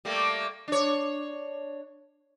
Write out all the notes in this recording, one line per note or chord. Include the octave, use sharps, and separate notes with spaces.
G3 A3 A#3
D4 C#5